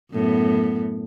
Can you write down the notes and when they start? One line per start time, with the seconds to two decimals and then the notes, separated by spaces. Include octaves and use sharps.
0.12 F#2 A2 B3